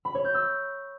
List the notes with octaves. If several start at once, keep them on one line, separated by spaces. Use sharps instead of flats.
B5
C#5
G6
E6